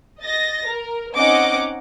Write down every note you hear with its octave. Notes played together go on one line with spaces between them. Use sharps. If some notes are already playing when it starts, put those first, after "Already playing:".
D#5 A6 A#6
A#4
C4 C#4 D#4 D#5 F#5 D6